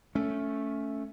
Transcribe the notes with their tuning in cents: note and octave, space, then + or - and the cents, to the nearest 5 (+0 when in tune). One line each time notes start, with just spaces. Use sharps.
A3 +0 C#4 +10